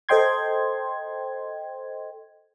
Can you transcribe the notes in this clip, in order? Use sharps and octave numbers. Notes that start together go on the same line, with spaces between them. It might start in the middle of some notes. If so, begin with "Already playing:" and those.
A4 C5 D#5 G5 C6 G#6